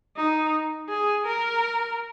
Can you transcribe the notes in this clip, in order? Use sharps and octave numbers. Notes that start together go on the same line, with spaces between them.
D#4
G#4
A#4